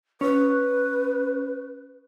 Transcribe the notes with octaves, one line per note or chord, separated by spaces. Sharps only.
C#4 B4